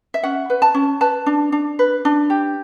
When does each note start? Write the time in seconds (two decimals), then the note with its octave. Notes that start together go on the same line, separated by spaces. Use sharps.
0.14 E5
0.23 C#4 F#5
0.50 B4
0.62 A5
0.74 C#4
1.01 B4 A5
1.26 D4
1.52 D4
1.79 B4
2.05 D4
2.30 G4